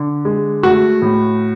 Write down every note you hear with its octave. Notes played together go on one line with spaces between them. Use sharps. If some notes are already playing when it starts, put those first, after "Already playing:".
Already playing: D3
G#3
A3 F#4
A2